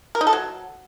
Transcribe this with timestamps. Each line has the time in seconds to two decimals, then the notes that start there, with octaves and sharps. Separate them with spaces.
0.15 A#4
0.21 D#4
0.27 A4
0.33 F#3